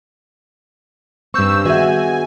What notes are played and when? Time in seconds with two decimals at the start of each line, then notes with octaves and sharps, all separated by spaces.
1.34 G2 C4 C#4 C#6 E6 G6
1.65 D#3 B3 F#4 G#4 E5 G#5